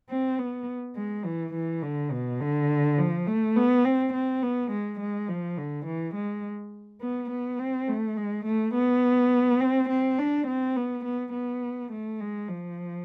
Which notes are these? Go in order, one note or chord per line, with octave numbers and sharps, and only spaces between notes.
C4
B3
G#3
E3
E3
D3
B2
D3
F3
A3
B3
C4
C4
B3
G#3
G#3
F3
D3
E3
G#3
B3
B3
C4
A3
G#3
A3
B3
C4
C4
D4
C4
B3
B3
B3
A3
G#3
F3